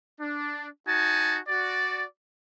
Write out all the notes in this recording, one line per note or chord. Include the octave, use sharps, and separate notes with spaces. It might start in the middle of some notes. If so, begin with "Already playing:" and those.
D4
D#4 F#4 G#5 A5
F#4 D5